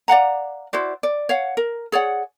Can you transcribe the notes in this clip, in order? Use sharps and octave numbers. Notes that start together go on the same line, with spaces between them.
D5 F5 F#5 A#5
E4 F#4 C5 D5
D5
C#5 F5 F#5
A#4
G#4 C#5 D5 F#5